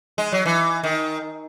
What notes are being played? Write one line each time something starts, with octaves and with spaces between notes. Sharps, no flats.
G#3
F#3
E3
D#3